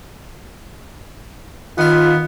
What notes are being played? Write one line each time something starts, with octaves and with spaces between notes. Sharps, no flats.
D#3 B3 F4 F5